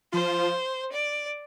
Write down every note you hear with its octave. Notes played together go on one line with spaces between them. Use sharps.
F3 F4 C5
D5